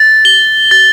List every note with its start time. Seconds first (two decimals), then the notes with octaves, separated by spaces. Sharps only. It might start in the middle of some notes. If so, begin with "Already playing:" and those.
Already playing: A6
0.25 G7
0.71 A6